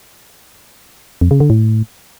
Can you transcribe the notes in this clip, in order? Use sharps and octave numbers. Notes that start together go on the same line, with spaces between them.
F2
C#3
D3
A2